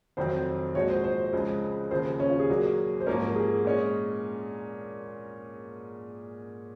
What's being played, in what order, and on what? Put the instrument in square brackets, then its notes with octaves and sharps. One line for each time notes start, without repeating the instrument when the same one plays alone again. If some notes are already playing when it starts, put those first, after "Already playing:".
[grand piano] F1 F2 D#3 F#3 C4 [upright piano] C5
[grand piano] A#2 F3 G#3 D#4 F#4 [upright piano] C#5
[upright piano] C5
C5
C5
[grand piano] C#2 C#3 F3 G#3
[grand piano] D#2 C#3 F3 [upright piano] C5
[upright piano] C#4
F4
G#4
[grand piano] A#2 F#3 A#3 C#4
[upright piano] C5
[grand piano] G#2 F3 A#3 C#4 [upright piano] A#4
[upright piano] A#4
G#4
[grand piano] A#2 G#3 C#4